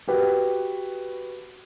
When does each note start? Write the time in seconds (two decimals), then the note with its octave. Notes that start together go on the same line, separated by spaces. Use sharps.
0.08 F#4 G4 B4